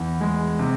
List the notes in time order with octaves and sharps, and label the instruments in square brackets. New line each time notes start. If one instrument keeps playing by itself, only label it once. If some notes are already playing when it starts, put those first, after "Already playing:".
Already playing: [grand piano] E2
G#3
C3